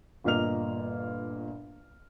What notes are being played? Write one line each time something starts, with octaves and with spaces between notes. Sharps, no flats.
G1 A#2 A#3 D#5 F6 F7